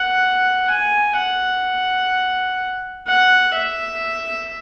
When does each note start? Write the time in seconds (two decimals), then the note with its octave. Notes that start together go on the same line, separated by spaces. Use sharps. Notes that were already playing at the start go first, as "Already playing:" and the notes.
Already playing: F#5
0.71 G#5
1.18 F#5
3.08 F#5
3.55 E5